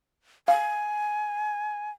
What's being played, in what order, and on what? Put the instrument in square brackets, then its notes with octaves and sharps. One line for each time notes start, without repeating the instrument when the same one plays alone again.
[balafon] F5 [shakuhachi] G#5